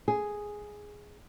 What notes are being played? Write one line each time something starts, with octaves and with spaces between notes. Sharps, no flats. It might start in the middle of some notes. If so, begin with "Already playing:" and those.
G#4